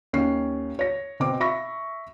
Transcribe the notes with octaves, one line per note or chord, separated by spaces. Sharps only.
D#2 C#4 C7
C#5 A#6
B2 C4 D6
E5 B5 C#6 A#6